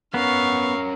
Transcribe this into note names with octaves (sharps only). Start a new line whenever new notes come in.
B3 C#4 A#4 F5 C#6